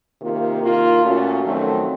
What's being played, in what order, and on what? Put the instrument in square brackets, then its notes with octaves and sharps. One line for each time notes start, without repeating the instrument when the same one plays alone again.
[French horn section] C3 D#3 A#3 F4
D#3 A#3 F4
A#2 A3 C#4 F#4
F2 D#3 F#3 A3 C4